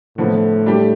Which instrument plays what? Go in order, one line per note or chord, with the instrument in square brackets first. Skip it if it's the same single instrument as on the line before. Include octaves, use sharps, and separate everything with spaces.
[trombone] A2 [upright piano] D3 F3 B3
[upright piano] G3 D4 G4